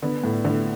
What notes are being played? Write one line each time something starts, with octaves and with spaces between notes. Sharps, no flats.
D3 B3
A2
A2 D3